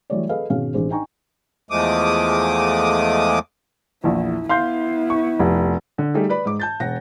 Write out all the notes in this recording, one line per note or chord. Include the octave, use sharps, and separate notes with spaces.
E3 F#3 G3 A3 C#5 D5
G#4 A4 B4 D#5 F5
G#1 B2 C#4 G#4 F5
A1 D4 G#4 C5
D4 D#4 G5 G#5 A#5 C#6
E2 F3 G#3 A3 D6 D#6
A#1 E2 E4
B3 E4 F5 C6 G6
C#6
F1
D3
G3 A3 D#4 G4 G#4
B4 D5 B5
G#2 D6
A5 G6 A6
E1 F#5 A#6